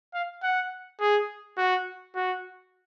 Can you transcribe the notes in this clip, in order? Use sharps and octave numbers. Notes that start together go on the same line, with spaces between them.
F5
F#5
G#4
F#4
F#4